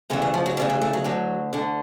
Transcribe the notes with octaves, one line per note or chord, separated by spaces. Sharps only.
D2 C#3 E3 G#3
G3
F3
F#3
D2 C#3 E3 G3
G3
A3
F#3
D2 D3 F#3
D2 D3